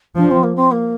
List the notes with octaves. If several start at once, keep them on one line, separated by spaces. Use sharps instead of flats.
F3 D4
C4
A#3
C4
A#3